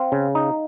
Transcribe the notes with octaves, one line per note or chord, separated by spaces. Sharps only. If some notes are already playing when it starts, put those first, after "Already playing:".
Already playing: C4 F5
C#3
D#4